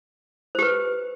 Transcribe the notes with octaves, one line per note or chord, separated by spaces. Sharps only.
G4 B4 C5